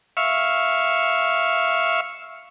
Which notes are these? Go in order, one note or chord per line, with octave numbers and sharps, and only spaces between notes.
E5 F5 C#6